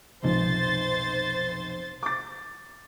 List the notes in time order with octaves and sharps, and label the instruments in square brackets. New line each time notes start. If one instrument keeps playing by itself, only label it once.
[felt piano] F1 B1 F3 [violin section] C5 A6
[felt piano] D6 A6